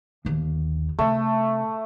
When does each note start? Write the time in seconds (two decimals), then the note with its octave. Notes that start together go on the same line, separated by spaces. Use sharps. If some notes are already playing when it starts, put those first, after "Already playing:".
0.25 G1 D#2
0.99 C3 A3